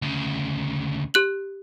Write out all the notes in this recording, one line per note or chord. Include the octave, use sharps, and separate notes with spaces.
D2 C#3
G4 F#6 F#7